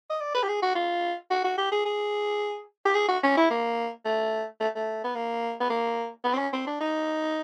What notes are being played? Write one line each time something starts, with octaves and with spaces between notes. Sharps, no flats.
D#5
D5
B4
G4
G#4
F#4
F4
F#4
F#4
G4
G#4
G#4
G4
G#4
F#4
C#4
E4
A#3
A3
A3
A3
B3
A#3
B3
A#3
B3
C4
C#4
C4
D4
D#4